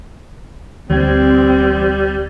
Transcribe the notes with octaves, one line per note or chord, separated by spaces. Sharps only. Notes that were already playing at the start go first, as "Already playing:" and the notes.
D2 E3 G3 C4 G#6